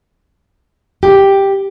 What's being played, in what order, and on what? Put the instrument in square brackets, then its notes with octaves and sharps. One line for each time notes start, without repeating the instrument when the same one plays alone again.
[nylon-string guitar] G4